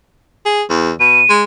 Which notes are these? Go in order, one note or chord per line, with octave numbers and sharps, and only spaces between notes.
G#4
E2
B2 D#7
G#3